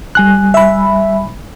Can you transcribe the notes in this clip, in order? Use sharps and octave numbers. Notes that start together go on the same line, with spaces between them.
G3 G#5 F#6
E5 B5